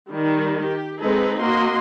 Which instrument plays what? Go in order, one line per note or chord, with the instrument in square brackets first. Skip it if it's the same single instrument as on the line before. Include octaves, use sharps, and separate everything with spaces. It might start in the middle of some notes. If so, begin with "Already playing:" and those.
[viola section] D#3 G3
G4
G#3 C4 D#4 G#4 A4 B4
A#3 F#4 D#5 C6